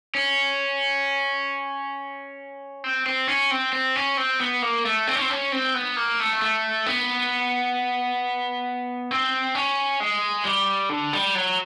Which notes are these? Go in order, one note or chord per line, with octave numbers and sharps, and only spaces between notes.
C#4
C4
C4
C#4
C4
C4
C#4
C4
B3
A#3
A3
C4
C#4
C4
C#4
C4
B3
A#3
A3
A3
B3
C4
C#4
G#3
G3
D3
G3
F#3